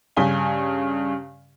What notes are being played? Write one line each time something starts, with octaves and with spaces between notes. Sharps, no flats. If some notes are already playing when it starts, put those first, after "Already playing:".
G2 C#3 G#5 B6 G7